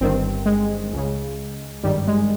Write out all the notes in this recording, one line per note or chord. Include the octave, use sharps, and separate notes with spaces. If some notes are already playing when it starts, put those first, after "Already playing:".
G1 G2 D#3 C4
G#3
C#2 C#3
G#1 G2 D#3 G3
G#3